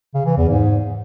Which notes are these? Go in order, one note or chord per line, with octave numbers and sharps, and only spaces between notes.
C#3
E3
E2
G#2